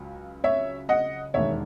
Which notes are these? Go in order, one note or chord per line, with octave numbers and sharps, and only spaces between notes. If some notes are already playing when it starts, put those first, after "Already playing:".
Already playing: C#2 C#3 F#3
C#5 E5
D#5 F#5
E1 D#2 D#3 G#3 C#5 E5